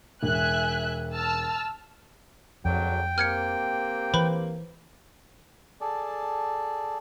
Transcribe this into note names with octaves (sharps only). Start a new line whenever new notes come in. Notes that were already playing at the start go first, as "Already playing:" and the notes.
E1 E5 G#5 F#6
A5 E6 F6
G#1 F2 D3 F#3 G5
A#3 C4 G4 F6 G#6 C#7
E3 B4 C5 B5
G#4 A4 D5 A5